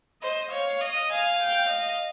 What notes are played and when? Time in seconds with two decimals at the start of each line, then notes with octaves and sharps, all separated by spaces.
0.22 C5 D#5
0.52 C#5 F5
0.81 D#5
1.10 F5 G#5
1.40 G5
1.70 D#5